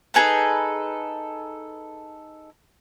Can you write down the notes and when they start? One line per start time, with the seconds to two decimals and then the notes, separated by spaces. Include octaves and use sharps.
0.14 D#4 G#4 A4 B4